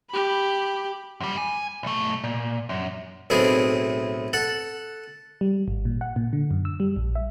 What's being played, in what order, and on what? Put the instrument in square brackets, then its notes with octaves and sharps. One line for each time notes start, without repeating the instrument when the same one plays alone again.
[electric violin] G4 B5
[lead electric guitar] F#2 G3
G#5
B1 A3
A#2
F#2
[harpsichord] B1 A2 A3 C4 E4 G#4
A4 F#5
[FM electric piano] G3
G#1
A#2
F#5
A#2
D3
F#2
E6
G3
A#1
E5